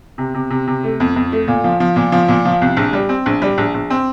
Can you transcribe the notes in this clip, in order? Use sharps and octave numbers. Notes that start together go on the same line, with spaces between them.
C3
C3
C3
C3
A3
F2
F2
A3
A#2
F3
F3
A#2
F3
A#2
F3
C2
A#1
G3
C4
A#1
G3
A#1
A#1
C4